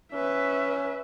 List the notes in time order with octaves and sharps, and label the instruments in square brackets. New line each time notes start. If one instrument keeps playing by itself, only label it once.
[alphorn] C#4 [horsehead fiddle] B4 E5